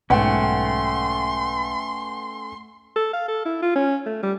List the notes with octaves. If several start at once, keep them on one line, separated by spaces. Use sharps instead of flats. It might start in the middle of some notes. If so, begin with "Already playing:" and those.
B1 G#2 A3 C#4 B4 F#5 G5 C6
A4
F5
A4
E4
F4
C#4
A3
G3